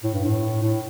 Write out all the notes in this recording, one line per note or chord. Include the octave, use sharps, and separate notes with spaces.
A2
G2
A2
A2